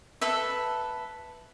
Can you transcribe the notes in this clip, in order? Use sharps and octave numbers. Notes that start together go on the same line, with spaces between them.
A4 B4 E5